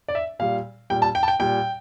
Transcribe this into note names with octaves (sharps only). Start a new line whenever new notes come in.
D5
E5
A#2 G3 F5
A#2 G3 G5
A5
G5
A5
G5
A#2 G3 G5